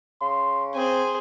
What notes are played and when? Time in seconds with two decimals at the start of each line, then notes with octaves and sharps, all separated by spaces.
0.21 C#3 C6
0.75 C4 G#4 C5